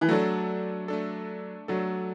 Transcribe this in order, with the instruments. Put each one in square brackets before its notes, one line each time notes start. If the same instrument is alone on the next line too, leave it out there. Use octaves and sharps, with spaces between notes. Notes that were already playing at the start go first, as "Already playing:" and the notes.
[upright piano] E3
[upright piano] F#3 [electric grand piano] A3 D4 A4
[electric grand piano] A3 D4 A4
[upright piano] F#3 [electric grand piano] A3 D4 A4